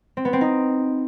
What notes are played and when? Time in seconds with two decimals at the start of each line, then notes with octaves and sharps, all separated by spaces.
0.17 C4
0.25 B3
0.33 C4
0.41 D#4